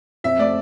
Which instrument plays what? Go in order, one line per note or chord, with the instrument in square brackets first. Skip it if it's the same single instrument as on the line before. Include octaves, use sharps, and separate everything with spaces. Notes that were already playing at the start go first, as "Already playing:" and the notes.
[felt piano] F2 [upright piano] E5
[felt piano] A3 [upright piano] D5